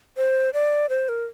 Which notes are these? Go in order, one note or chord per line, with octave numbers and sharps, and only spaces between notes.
C5
D5
C5
A#4